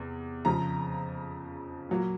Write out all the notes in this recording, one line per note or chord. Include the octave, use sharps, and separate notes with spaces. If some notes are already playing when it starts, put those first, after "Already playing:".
Already playing: E2 C3
F2 C#3 F3 A#5
A#2 F#3 A#3